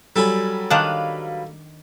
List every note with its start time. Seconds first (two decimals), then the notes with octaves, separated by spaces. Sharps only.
0.16 F#3 G3 A4 G#5 B5
0.70 D#3 D4 B4 F5 F#5